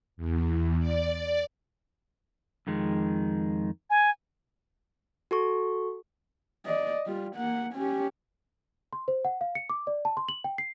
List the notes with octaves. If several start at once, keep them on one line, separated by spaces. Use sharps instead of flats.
E2
D5
F2 D#3 G#3
G#5
F#4 A4 C#6
D5 D#5
G3 F4
A#3 F#5
C#4 G4
C6
C5
F#5
F5
C#7
D6
D5
A5
C6
F#7
G5
C7